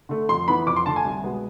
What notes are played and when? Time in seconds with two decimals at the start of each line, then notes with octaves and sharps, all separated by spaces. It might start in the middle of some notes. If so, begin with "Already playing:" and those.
0.09 D3 A3
0.29 F2 C6
0.48 E3 B3 B5
0.67 F2 D6
0.76 C6
0.86 D3 A3 A5
0.96 G#5
1.05 C2
1.24 B2 G#3 B3